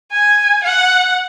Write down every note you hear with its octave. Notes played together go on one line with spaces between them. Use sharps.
G#5
F#5